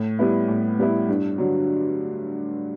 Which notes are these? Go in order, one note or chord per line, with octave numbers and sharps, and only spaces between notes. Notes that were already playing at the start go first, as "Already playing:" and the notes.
Already playing: A2
G3 B3 E4
A2
G3 B3 E4
G2
D3 F#3